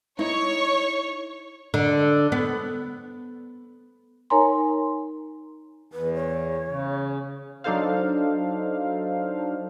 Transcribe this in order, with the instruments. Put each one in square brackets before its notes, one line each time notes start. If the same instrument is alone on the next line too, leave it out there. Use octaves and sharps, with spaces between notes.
[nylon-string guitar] D#4 E4 [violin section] C#5 C#6
[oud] D3
B3
[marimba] D#4 A#4 C#5 G#5 A#5 C6
[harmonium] E2 [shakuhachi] B4
[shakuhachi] C#5
[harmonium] C#3
[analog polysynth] F#3 D4 D#4 A4 C5 F5